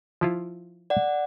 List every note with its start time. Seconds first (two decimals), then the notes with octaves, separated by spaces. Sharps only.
0.21 F3 E4 F4
0.90 D5 F#5